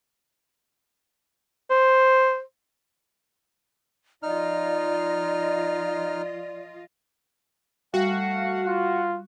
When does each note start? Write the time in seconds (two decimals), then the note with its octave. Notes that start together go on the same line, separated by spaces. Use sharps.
1.71 C5
4.23 F3 D#4 F4 D5 D#5 F6
7.94 G3 A3 F#4 F5 F#5
8.65 F4